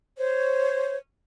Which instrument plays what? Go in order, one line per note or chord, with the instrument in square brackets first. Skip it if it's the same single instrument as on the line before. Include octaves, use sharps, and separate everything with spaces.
[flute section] C5 C#5